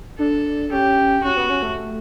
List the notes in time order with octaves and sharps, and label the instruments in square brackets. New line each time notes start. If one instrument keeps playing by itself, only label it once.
[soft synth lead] D4 [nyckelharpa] A4
[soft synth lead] C#4 [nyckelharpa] G4
[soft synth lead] C#4 [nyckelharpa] F#4
[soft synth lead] B3
C#4
A3